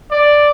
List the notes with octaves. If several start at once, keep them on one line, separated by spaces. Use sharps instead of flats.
D5